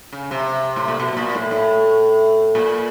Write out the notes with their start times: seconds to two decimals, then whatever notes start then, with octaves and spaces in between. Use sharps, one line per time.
0.12 C#3
0.31 C3
0.76 A2
0.88 A#2
1.00 B2
1.17 A#2
1.35 A2
1.51 A2
2.55 A#2